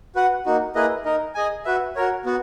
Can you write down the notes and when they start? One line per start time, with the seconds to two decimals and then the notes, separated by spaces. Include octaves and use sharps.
0.15 F#4 B4 F#5
0.46 A#3 D#4 F#4
0.75 A#3 E4 G#4 B4 D#5
1.05 D#4 A#4 D#5
1.35 G#4 D#5 G#5
1.65 F#4 B4 E5
1.95 F#4 A#4 C#5
2.25 B3 F#4